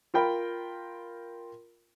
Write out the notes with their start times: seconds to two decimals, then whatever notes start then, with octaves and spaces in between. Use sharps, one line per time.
0.14 F4 A#4 G5 B5